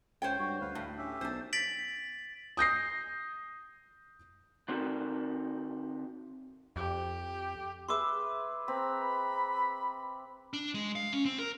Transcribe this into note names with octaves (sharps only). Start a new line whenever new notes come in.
C#2 C5 C#5 G5
G2 F#4
D2 B4 F5
D2 A2
C#4 G4 E5
B1 D4 C5
A6 B6 D7 F#7
D#6 G6 A#6 C7
D3 C4 D#4 F#4 A4 A#4
F2 G4
G#4 B4 E5 C6 D6
C4 B4 A#5 B5
D4
G#3
F5
C#4
C4
A#4